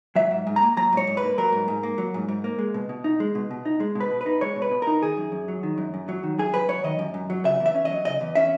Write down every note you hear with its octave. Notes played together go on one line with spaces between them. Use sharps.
F#3 E5
G#2
G#2
A#5
A#3
F#3 A#5
G#2 C#5
G#2
B4
A#3
F#3 A#4
G#2
G#2
A#3
F#3
G#2
G#2
A#3
G#3
B2
B2
D#4
G#3
B2
B2
D#4
G#3
B2
B4
B2
B4
D#4
G#3 C#5
B2
B4
B2
D#4 A#4
D#3 G#4
F#2
F#2
F#3
D#3
F#2
F#2
F#3
D#3
F#2 G#4
F#2 B4
F#3 C#5
D#3 D#5
F#2
F#2
F#3
C#3 E5
E2
E5
C#4
F#3 D#5
C#3 D#5
E2
C#4 E5